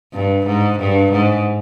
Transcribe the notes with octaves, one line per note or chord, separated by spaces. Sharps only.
G2
G#2
G2
G#2